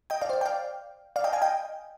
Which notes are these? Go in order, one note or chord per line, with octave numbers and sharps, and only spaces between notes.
D#5 G5
D5 F5
C5
D5
G5
D5 F5
D5 F5
D#5 G5
F5 G#5
D#5 G5